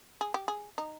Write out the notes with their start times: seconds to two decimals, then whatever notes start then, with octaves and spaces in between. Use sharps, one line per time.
0.21 G#4
0.34 G4
0.48 G#4
0.78 D#4